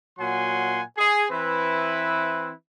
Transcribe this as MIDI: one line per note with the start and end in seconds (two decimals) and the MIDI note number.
0.18 0.81 46
0.18 0.81 54
0.18 0.81 78
0.18 0.81 80
0.18 0.81 84
0.97 1.25 68
1.31 2.51 52
1.31 2.51 60
1.31 2.51 64
1.31 2.51 71